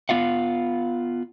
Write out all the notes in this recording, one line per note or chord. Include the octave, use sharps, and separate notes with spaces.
B3 F4 F5 F#5